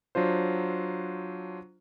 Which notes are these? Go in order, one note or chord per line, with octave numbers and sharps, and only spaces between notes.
F#3 D4 F4 C5